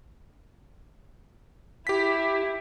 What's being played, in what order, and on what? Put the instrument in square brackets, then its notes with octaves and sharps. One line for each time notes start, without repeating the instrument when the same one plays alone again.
[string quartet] E4 [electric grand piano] G4 B6